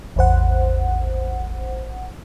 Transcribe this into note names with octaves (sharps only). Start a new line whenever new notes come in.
A1 E2 C5 F#5